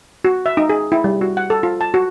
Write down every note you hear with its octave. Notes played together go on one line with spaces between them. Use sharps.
F#4
E5
D#4
G#4
E4
G3
F#4
F#5
A4
F4
A5
F#4